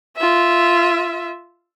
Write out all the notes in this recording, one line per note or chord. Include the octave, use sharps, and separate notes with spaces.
F4 E5